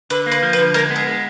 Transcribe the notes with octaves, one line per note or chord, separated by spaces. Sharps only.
D3 B4
A#3
B4
F3
B4
D3
G#3 A#4
B3
G#4
G#3